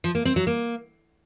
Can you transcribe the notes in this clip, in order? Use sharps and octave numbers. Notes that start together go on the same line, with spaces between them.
F3
A#3
C4
F#3
A#3